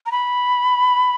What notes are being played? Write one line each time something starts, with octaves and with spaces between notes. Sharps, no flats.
A#5
B5